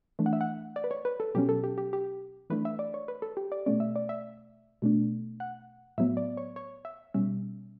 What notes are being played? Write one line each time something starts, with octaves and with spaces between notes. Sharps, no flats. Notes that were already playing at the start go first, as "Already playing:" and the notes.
E3 A3 D4
F#5
E5
F#5
D5
B4
C#5
B4
A4
B2 F#3 C#4 G4
A4
G4
G4
G4
E3 A3 D4 B4
E5
D5
C#5
B4
A4
G4
D5
B2 A3 C#4 D5
E5
D5
E5
B2 A3 D4
F#5
A2 F#3 B3 E5
D5
C#5
C#5
E5
B2 G3 C#4 E5